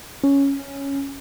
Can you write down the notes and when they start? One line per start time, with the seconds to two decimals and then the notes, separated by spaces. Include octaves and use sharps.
0.24 C#4